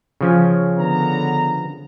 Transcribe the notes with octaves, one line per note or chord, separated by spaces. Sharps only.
C#3 F3 C#4
D3 B3 A#5